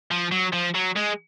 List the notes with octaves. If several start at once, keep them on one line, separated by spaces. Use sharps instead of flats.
F3
F#3
F3
F#3
G#3